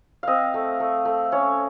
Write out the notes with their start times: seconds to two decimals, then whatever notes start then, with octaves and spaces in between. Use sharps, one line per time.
0.23 C4 D#5 F5
0.54 A3
0.80 A3
1.05 A3
1.32 C#4 C#5